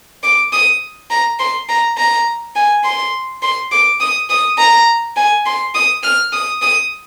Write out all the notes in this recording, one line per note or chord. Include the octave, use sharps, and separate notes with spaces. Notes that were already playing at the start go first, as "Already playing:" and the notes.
D6
D#6
A#5
C6
A#5
A#5
G#5
C6
C6
D6
D#6
D#6
A#5
G#5
C6
D#6
F6
D#6
D#6